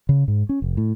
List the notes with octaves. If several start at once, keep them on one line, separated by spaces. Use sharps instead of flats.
C#3
G#2
C#4
F1
A2